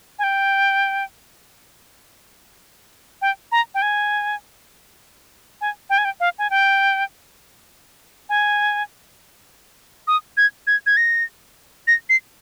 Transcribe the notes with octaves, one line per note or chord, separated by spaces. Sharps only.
G#5
G5
G5
A#5
G5
G#5
G#5
G5
G#5
G5
F5
G#5
G5
G#5
D#6
G#6
G#6
G#6
A#6
A#6
C7